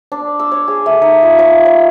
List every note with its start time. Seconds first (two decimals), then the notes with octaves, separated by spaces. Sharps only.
0.12 D4
0.39 E6
0.52 C#5
0.68 G#4
0.86 A3
1.02 D#4
1.23 F4
1.39 C#5
1.65 C#5